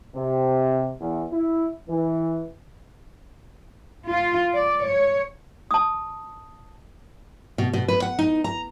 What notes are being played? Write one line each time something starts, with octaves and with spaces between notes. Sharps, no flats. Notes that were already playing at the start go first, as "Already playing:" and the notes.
C3
E2
E4
E3
F4
D5
C#5
A5 D#6
B2
B2
B4
F#5
D#4
A#5